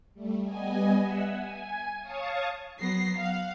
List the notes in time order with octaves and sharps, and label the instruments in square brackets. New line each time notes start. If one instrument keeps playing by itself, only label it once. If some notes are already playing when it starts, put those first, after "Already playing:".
[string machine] G3 A3
G3 B3 D#5 G#5
E5 F#5 E6
G#5
C#5 F5 A5 C#6 D#6
[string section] F#3 B3 A#6 C7
F5 F#5